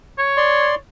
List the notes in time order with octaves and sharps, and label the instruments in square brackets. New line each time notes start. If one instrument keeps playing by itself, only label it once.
[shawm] C#5
[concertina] D5 C6